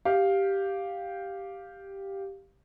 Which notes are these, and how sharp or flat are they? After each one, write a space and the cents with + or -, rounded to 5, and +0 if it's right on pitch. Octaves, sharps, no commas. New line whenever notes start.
G4 +0 F5 +5